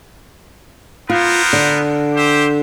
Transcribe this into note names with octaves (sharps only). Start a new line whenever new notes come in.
B3 F4 A#4 C5
D3
G4 C5 E5